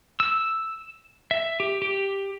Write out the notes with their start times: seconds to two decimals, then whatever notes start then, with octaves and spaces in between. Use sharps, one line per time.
0.20 E6
1.31 E5
1.60 G4
1.82 G4